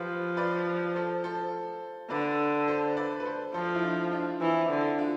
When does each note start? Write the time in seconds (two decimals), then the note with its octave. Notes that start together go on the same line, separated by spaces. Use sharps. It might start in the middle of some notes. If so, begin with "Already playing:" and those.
Already playing: F3 G4 B4
0.37 B4 D5
0.95 A4 C5
1.24 A4 C5
2.10 D3 B4 D5
2.68 A4 C5
2.97 B4 D5
3.20 B4
3.25 A4 C5
3.54 F3 A4 C5
3.74 E4
3.83 D4 F4
4.12 D4 F4
4.41 E3 C4 E4
4.70 D3
4.98 D4 F4